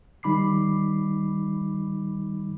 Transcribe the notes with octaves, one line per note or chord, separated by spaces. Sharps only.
D#3 G3 D#4 B5 D6 C7